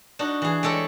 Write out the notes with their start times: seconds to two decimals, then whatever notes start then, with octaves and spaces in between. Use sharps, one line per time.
0.19 D4 D#4 F#4
0.42 E3 G#4
0.63 G#3 G4 A4 C#5 D5